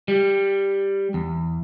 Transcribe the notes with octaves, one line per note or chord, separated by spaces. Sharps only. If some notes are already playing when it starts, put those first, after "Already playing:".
G3
E2